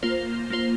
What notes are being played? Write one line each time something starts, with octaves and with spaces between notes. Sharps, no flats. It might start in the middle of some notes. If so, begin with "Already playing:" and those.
A#3 F4 C5
A#3 F4 C5